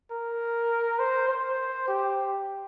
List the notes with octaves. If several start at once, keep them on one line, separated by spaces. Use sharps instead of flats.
A#4
C5
C5
G4